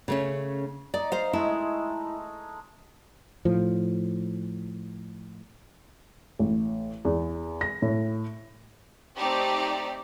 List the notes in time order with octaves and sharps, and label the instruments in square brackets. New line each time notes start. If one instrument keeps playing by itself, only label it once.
[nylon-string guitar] C#3 A3 C#4
[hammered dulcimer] D#4 [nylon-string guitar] D5
[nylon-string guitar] C5 F5
[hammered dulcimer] G#3 A3 [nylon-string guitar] E4
[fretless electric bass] A2 F3
[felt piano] A1
E2
A#6
A2
[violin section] A3 C4 D#4 G4 D5